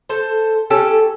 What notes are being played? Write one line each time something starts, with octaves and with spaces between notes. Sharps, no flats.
A4 C5
C#4 G4 A4